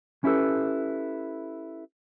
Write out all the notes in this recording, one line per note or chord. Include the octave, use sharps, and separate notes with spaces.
C#4 E4 G4 A4 B4